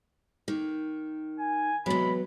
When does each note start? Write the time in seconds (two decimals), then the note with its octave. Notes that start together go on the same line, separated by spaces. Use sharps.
0.48 D#3 A#3
1.39 G#5
1.86 C3 E3 F#3 G#3 B3 B5